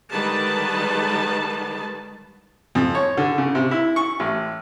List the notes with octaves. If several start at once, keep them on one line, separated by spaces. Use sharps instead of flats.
D3 D#3 G3 G#3 B4 A5
F2
C#5
D3
C#3
C3
E4
C#6
A1